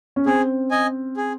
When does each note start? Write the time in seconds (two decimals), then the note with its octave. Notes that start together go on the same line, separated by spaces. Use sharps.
0.16 C#4
0.26 C4 G#4
0.71 D#5 G#5
1.17 G#4